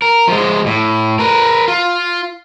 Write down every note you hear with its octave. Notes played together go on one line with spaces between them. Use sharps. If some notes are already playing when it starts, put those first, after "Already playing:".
A#4
F3 G#3
A2
A#4 B4
F4